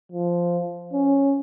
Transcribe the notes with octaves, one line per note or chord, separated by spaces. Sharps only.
F3
C#4